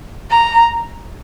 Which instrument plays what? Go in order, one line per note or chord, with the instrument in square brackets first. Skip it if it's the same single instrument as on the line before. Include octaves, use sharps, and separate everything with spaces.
[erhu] A#5